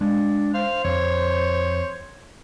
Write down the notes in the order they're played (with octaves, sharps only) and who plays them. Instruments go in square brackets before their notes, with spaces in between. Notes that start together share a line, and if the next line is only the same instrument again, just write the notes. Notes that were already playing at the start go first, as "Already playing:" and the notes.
[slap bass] G#3 [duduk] D4
[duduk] C5 [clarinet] F5
[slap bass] F2 [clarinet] C#5